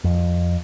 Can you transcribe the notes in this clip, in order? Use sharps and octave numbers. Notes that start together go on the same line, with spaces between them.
F2